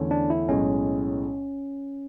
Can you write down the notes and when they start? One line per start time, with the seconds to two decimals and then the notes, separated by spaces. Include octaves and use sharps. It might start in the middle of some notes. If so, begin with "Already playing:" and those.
Already playing: E2 D3 A3 C#4
0.11 D4
0.30 E4
0.48 B1 A2 G#3 C#4